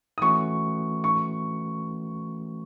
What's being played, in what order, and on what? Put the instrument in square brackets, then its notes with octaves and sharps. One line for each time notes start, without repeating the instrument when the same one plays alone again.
[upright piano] D#6
[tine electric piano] E3 A3 C#4 F#4 B4 [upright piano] C#6
[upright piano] C#6